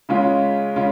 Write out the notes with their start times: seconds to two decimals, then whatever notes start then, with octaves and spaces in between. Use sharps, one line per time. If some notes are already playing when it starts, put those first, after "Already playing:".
0.09 C#3 G#3 C#4 F4
0.76 C#3 G#3 C#4 F4